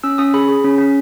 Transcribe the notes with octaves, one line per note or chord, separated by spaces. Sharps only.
C#4 E6
C#4 D#6
G#4 B5
G#4
C#4
C#4